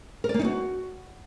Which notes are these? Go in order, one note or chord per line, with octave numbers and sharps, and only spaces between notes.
A#4
D5
A#3
D#4
F#4